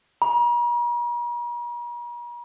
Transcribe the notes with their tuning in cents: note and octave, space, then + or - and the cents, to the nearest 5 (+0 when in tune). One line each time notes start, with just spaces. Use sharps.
A#5 +45